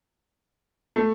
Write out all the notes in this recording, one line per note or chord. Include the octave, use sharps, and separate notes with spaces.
A3